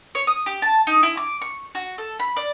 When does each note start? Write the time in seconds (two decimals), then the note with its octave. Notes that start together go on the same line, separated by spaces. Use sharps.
0.15 C#5
0.27 D#6
0.46 G4
0.62 A5
0.87 D#4
1.03 E4
1.17 D6
1.41 C#6
1.75 F#4
1.98 A4
2.20 B5
2.36 D5